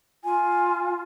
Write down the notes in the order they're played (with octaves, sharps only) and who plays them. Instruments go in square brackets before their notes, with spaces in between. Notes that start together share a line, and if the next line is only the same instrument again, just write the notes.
[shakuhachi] F4 [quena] G#5